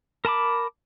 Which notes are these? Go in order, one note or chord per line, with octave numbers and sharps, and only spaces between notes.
A#4 A5 B5 D6